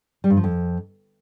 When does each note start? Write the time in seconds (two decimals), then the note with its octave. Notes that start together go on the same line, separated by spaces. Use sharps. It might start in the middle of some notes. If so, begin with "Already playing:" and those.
0.24 G3
0.30 G2
0.37 F3
0.44 F2